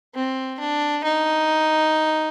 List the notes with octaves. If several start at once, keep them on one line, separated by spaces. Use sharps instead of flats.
C4
D4
D#4